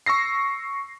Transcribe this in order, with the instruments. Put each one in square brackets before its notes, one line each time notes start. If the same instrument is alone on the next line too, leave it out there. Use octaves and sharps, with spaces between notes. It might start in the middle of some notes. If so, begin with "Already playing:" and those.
[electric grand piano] C#6 E6 A#6 C7